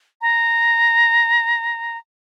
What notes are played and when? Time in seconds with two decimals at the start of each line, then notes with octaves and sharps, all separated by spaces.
0.21 A#5